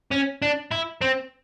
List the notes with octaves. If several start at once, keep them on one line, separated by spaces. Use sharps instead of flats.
C#4
D4
E4
C4